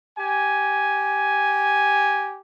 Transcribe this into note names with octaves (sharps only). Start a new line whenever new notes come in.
G4 G#5